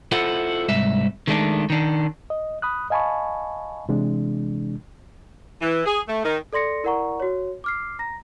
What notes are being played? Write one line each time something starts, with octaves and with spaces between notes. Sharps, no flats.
E4 F4 A4 C5 F#5
C2 G#2 E5
D#3 G#3 A3 B3 D4
D#3 D4
D#5
B5 D#6 F#6
D#5 F5 G#5 A5 B5 C#6
C3 E3 G#3 D4
E3
G#4
A3
D#3
A4 D5 C6 A#6 C#7
E4 A#4 D5 F#5 A#5 C#6
F#4 C#5
D6 F6 C7
A#5 A#6